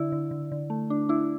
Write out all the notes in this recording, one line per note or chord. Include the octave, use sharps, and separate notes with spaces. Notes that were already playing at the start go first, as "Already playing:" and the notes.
Already playing: D3 E4
D3
D3
D3
A3
D4
D4 E4